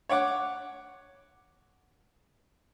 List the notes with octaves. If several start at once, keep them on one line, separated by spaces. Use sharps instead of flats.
C#5 F#5 D6